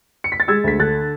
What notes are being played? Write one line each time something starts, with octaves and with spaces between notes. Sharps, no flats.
C#7
B6
A6
G#3 E6 G#6
D2 B6
D3 F#6 A6